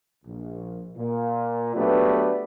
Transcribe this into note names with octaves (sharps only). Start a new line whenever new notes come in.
A#1
A#2
F#3 A3 B3 D4 G4 B4